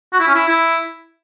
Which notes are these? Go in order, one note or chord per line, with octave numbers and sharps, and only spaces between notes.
F#4
E4
C#4
E4
E4